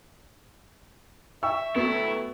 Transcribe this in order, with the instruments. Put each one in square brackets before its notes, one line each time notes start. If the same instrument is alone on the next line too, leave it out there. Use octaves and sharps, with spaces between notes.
[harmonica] E5 [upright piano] G5 C#6 E6
[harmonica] F#3 A3 [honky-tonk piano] B3 [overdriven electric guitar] E4